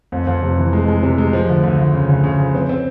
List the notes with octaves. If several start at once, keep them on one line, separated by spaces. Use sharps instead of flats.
F2
F2
C3
E3
G#3
G#3
C3
G#3
F3
D2
D2
D2
C#3
D2
C#3
F3
C4
C4